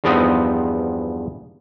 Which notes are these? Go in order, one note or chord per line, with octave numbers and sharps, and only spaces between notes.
E2 G2 F3 B3 C4 D#4